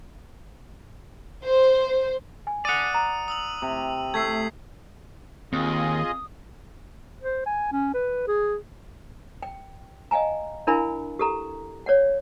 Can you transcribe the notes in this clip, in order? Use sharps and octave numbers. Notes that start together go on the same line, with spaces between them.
C5
G#5
D5 F#5 D#6 D#7
A#5
D#6 E6 F#7
C3
A3 G#6 B6 C7
D#2 C4 F4 G#4 D#5 D#6
C5
G#5
C#4
B4
G#4
G5
D#5 F5 G5 G#5 A#5
D4 E4 A#4 F5 G#5 B5
G4 A4 A#5
C#5 D5 F#5